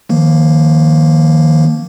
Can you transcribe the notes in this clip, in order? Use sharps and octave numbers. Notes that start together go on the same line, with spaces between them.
D#3 F3 A#3